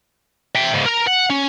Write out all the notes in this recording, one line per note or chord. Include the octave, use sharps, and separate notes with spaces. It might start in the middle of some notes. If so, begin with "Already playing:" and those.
E5 G5
G#2 C#3
A#4 A#5
F#5
C#4